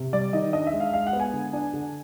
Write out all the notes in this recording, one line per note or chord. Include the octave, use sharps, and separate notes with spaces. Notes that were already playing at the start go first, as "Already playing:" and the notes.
Already playing: C3
G3 D5
D#3 D#5
D4 D#5
E5
G#3
F5
G#3 F5
F#5
B3
G#5
D3
D4
D3